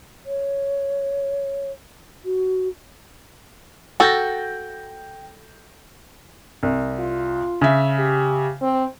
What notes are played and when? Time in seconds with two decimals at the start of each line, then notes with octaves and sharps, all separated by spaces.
0.26 C#5
2.25 F#4
4.00 F#4 A4 G5 G6 A#6
6.63 C2
6.99 F4
7.61 C#3 E5
7.99 G4
8.62 C4